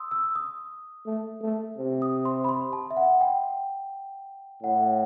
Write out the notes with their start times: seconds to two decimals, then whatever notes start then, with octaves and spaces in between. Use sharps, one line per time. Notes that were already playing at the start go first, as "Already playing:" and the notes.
Already playing: C6 D#6 E6
0.11 E6
0.35 D#6
1.06 A3
1.42 A3
1.78 C3
2.02 D#6
2.25 C6
2.44 B5
2.49 C6
2.73 A5
2.91 E5
2.97 F#5
3.21 G5
4.63 A2 F#5